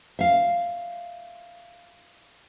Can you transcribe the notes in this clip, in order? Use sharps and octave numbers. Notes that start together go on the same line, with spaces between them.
E5 F5